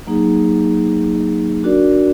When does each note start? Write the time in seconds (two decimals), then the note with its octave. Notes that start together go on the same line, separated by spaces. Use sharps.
0.07 F#3 A#3 D#4 G#4
1.63 D4 F#4 A#4 D5